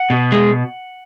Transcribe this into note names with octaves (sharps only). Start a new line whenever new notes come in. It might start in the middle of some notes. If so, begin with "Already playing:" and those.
Already playing: F#5
B2
G#3